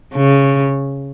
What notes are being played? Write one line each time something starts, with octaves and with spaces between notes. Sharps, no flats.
C#3